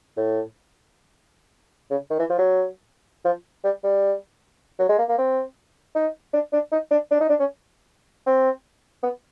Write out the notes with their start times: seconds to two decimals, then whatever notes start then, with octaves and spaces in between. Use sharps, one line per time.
0.17 A2
1.90 C#3
2.10 D#3
2.19 E3
2.29 F3
2.38 F#3
3.25 F3
3.64 G3
3.84 G3
4.79 F#3
4.89 G#3
4.98 A#3
5.09 A#3
5.18 C4
5.95 D#4
6.33 D4
6.53 D4
6.72 D#4
6.91 D4
7.11 D4
7.20 D#4
7.29 D4
7.40 C#4
8.26 C4
9.03 B3